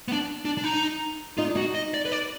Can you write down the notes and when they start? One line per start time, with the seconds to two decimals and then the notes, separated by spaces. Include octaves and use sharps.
0.08 B3
0.12 D4
0.45 D4
0.58 D4
0.64 D#4
1.38 D#4 F4
1.47 D4
1.55 D#4 F#4
1.75 D#5
1.94 D5
2.05 B4
2.12 D5